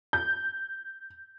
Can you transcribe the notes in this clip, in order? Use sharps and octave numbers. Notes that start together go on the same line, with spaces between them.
G6